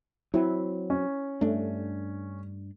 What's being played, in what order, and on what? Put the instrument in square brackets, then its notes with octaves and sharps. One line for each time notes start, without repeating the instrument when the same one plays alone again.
[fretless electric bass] F#3 C4 [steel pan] E4
[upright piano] C#4
[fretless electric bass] G2 D4 [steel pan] A3